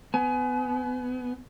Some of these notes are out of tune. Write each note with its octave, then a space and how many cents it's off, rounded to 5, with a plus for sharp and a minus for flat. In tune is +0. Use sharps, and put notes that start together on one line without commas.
B3 +25 G#5 +30